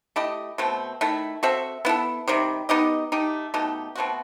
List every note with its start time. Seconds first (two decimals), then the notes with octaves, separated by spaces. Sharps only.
0.16 A3 E4 G4 D#5
0.58 B2 A3 C4
1.01 D#3 A3 E4
1.43 C4 F#4 A4 E5
1.85 B3 E4 A4
2.28 C3 D#3 G3
2.69 B3 D#4 G4 D#5
3.12 A3 D#4 G4
3.54 B2 A3 D#4 G4
3.95 B2 A3 C4 F#4